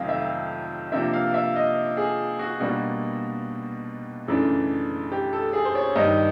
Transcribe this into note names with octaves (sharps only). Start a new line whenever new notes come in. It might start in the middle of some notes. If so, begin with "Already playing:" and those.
Already playing: F2 C3 D#3 F#3 A3 F5
E5
C3 F3 A#3 D4 E5
F5
E5
D#5
G#4
F#4
B2 G3 A#3 D4 F#4
F#2 C#3 E3 A3 D4
G4
A4
G#4
C5
C#5
G2 D#3 G3 D#5